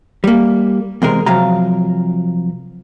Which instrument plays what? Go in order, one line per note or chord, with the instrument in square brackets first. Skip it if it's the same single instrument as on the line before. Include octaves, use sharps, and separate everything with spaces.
[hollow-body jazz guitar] G3 A#3
E2 C3 G#3 A#4
C3 F3 F#3 F5 A#5